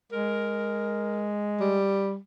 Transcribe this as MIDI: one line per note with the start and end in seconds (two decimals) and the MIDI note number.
0.12 1.81 56
0.12 1.31 70
1.60 2.17 55